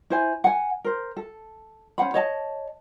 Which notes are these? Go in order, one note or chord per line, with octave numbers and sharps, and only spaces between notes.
E4 C5 G#5
F#5 G#5
A#4 C5
A4
C#4 C5 F#5 B5
C#5 D#5 A5